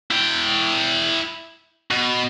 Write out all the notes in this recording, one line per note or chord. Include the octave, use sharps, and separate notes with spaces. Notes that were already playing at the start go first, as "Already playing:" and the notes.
E4 G5
B2